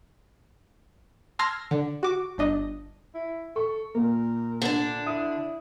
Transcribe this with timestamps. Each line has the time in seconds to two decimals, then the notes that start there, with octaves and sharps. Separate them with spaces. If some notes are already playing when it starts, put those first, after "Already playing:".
1.39 A5 C6 E6 F6 G#6 A#6
1.71 D3
2.03 F#4 D6
2.38 G1 D4 D#5
3.15 E4
3.56 A4 C#6
3.95 A#2 A#3 A#4
4.62 D3 D4
5.06 E4 D#6